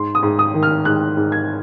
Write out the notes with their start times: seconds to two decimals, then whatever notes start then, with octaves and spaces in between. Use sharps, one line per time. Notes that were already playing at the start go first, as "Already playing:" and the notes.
Already playing: G#2 C6
0.15 D#6
0.23 G#2
0.39 D#6
0.54 D#3
0.63 F6
0.85 G#2 F#6
1.17 G#2
1.32 G#6